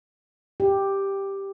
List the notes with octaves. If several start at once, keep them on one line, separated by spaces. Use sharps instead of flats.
G4